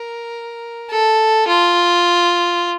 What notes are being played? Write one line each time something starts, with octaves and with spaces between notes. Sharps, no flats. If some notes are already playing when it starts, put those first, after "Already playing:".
Already playing: A#4
A4
F4